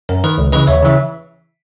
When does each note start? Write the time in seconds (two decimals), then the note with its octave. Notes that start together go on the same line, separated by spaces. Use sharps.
0.09 F#2 A#4
0.24 D#3 B4
0.38 C#2
0.52 C#3 E3 B4 D#5
0.67 D#2 C#5 E5
0.82 C#3 E3 E5